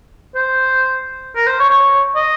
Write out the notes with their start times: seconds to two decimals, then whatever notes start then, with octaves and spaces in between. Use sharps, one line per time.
0.35 C5
1.36 A#4
1.47 C5
1.59 C#5
1.70 C#5
2.16 D#5